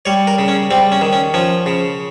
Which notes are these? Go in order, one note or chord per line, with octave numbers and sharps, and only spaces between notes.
G3 C#5
A#4
C#3
C#4
G3 C4
C#4
D#3
C#4
F3 C#4
C#3